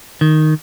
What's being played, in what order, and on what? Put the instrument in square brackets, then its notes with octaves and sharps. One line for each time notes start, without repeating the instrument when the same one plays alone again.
[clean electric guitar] D#3